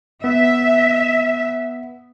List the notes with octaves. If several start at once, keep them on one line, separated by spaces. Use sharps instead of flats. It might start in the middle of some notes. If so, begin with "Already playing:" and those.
B3 E5